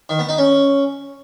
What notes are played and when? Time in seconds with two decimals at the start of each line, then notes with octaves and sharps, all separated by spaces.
0.09 D#3
0.19 B3
0.29 D#4
0.38 C#4